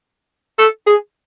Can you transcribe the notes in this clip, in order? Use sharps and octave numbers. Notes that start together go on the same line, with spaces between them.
A4
G#4